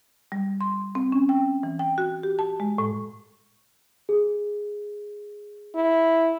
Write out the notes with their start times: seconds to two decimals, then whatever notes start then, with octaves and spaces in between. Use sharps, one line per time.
0.32 G3
0.61 C6
0.95 C4
1.12 C#4
1.29 G5
1.63 E3
1.79 G5
1.98 F#4
2.23 G4
2.39 A5
2.60 G#3
2.78 A2
4.09 G#4
5.75 E4